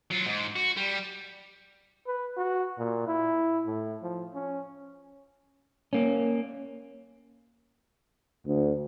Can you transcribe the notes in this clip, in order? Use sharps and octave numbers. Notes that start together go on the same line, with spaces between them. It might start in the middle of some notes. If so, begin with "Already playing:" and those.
F#3 F4
G#2
F#4
G3
B4
F#4
A#2
E4
A2
F3
C#4
A#3 C#4
D2